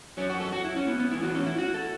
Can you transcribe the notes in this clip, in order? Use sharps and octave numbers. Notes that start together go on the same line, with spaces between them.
F#2 F#3 C#4
F#4
A4
F#4
E4
C#4
B3
B3
A2 E3 E4
F#4
C#4
E4
F#4
A4